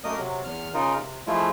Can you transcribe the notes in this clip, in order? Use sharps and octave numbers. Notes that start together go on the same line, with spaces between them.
F#2 A3 A#3 A#4 D#5 D#6
C3 F#3
E2 F6
C#3 D#4 F4 A#4
C3
F3 G#3 A3 E4 F4